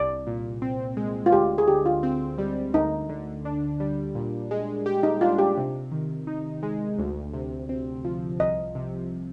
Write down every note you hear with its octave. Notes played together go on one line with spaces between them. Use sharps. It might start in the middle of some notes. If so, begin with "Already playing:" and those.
Already playing: C2 D5
A#2
C4
G#3
F4
D2 G4
G#4
D3 G4
F4
C4
G3
D2 D#4
D3
D4
G3
A#2
G#3
G4
D#4
D4 F4
G4
C3
D#3
D#4
G#3
D2
C3
C4
F3
C2 D#5
C3